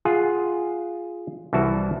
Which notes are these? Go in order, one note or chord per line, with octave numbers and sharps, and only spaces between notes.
F4 G#4 F#5
C2 E3 F#4 A5